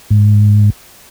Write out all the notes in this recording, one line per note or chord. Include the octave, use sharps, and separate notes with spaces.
G#2